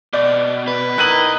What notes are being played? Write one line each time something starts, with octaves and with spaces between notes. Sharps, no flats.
B2 D5
B4
B1 D#3 D#4 E4 D#5 F#6 D#7 F#7